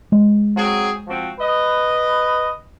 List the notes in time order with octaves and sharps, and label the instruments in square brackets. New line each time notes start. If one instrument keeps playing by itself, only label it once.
[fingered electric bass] G#3
[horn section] F#3 C4 G#4
F3 C4 F#4
B4 D#5